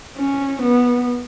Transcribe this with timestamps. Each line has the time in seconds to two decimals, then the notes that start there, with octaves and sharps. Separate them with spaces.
0.18 C#4
0.63 B3